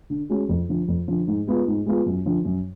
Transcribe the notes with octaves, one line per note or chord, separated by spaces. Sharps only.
D3
G#3 C#4 F#4
F2
D3 F3
F2
D3 F3
G#2
G#3 B3 F4
G#2
G#3 B3 F4
F#2
D3 F3
F#2